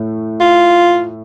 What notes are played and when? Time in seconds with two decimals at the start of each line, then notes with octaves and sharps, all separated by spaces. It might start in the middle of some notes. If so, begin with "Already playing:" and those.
Already playing: A2 A3
0.41 F4